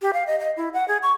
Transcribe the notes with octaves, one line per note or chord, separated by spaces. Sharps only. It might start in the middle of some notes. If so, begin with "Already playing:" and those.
G4
F5
D#5
D#5
E4
F#5
G#4
C#6